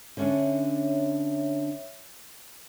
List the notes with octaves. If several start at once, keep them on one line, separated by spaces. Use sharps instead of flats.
D3 C#4 D4 C#5 E5